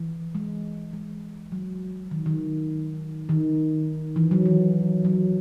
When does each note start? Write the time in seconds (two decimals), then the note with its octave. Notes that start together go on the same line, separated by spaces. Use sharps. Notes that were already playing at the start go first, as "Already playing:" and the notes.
Already playing: E3
0.35 G#3
0.93 G#3
1.52 F#3
2.11 D#3
2.26 D#3
3.29 D#3
4.16 E3
4.31 F#3
4.45 E3
5.04 F#3